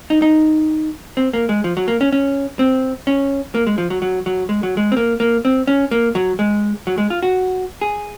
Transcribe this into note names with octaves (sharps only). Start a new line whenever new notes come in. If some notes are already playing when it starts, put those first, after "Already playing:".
D#4
D#4
C4
A#3
G#3
F3
F#3
A#3
C#4
C#4
C4
C#4
A#3
G#3
F3
F#3
F#3
F#3
G#3
F#3
G#3
C4
A#3
A#3
C4
C#4
A#3
F#3
G#3
F#3
G#3
F4
F#4
G#4